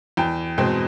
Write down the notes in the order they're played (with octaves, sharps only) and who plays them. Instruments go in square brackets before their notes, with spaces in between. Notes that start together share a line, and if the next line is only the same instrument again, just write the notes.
[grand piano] E2 G5
B2 G#3 C4 G5